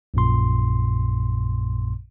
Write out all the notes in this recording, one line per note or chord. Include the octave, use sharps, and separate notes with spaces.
A#1 F#2 A#2 C6